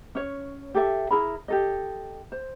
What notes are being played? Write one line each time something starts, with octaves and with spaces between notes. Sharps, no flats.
C#4 C#5
G4 A4 E5
E4 G#4 A#4 B5
G4 A4 D#5
C5